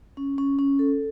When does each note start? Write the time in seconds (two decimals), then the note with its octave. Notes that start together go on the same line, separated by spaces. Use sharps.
0.17 C#4
0.38 C#4
0.59 C#4
0.79 A4